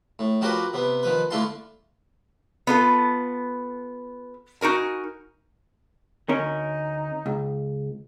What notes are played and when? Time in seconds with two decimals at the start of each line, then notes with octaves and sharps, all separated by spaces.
0.19 A2
0.41 F3 D4 F#4 G4 A#4 B4
0.73 C3 B3
1.03 D#3 F3 B4
1.31 D3 A3 E4 F4 A5 C6
2.67 B3 F4 A4
4.61 D#4 F#4 A#4 G#5
6.29 D2 C#4 D#4 A#4
7.26 C#2